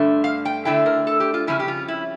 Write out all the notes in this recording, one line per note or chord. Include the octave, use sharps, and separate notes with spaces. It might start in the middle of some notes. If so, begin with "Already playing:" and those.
Already playing: G2 D3 A3
F5
G5
D3 A3 E4 G5
A#4
A4
G4
F4
F2 C#3 G3 C#4 E4
G4
F4
E4